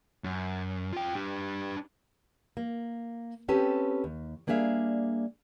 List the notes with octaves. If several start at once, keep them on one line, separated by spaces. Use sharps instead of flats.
F#2
F4 G5
D4 G4
A#3
C4 C#4 G4 A4 B4 A5
D#2
G3 A#3 D4 G#4 E5 F5